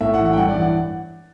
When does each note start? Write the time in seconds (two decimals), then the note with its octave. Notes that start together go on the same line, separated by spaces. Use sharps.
0.01 A2 E5
0.14 F#5
0.19 E3
0.25 F#5
0.33 G5
0.36 G2 F#5
0.48 D5
0.54 E3
0.61 F#5